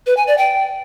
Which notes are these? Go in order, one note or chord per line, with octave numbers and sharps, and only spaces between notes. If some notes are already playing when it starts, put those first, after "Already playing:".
B4
G#5
D5
G5